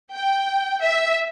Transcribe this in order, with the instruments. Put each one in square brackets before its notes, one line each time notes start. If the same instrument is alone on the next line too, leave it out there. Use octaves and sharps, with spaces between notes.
[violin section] G5
E5